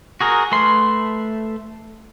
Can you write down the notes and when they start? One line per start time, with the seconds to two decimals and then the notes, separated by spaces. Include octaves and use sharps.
0.21 F#4 G#4 A#4
0.52 A3 B4 C6